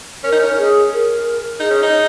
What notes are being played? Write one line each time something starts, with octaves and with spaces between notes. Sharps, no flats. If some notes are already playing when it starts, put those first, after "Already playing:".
C#4 A#4
D#4
C#4
G#4
A#4
D#4 G#4
C#4
D#4